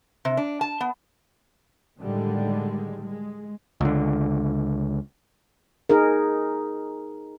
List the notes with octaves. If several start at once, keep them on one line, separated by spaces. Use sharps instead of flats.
C3
D4
A5
B3
A2 D3 D#3 G3 G#3
G#3
C#2 D3
D#4 G#4 A#4